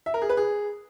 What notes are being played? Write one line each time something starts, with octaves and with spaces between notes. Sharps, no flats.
E5
A#4
G#4
B4
G#4